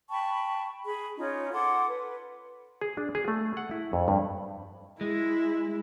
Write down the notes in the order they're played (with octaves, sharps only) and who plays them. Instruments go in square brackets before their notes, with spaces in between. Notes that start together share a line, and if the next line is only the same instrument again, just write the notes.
[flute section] G5 A5 B5 C#6
G#4 B5
C#4 D#4 F4 C#5
A4 F#5 C6 D6
B4
[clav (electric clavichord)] G#4
D4
G#4
A3
F#5
E4
F2
G2
[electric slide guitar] G#3 [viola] E4